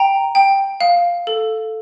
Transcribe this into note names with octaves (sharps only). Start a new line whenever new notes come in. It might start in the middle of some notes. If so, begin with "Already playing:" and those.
Already playing: G5 A#5
G5
F5
A4